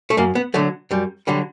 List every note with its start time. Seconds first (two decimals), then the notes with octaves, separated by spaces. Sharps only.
0.10 A3
0.17 F#2 A#3
0.35 B3
0.54 D3 F#3 A3
0.91 F#2 G3
1.27 D3 F#3 G3